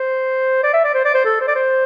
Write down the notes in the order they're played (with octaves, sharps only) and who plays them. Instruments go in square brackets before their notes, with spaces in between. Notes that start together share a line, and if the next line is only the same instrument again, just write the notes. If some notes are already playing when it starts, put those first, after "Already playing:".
Already playing: [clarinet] C5
D5
E5
D5
C5
D5
C5
A4
C5
D5
C5